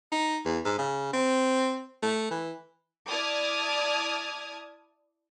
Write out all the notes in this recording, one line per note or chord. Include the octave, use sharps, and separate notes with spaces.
D#4
E2
G#2
C#3
C4
A3
E3
E4 D5 A5 D#6 F6 G#6